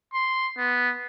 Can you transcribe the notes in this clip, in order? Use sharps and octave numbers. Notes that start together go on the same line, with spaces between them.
C6
B3